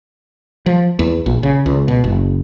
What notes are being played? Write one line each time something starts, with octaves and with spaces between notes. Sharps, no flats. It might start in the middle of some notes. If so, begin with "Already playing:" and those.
F3
E2
A#1
C#3
C#2
B2
F#1